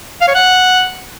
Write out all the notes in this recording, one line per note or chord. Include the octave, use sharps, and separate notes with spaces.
F5
C#5
F#5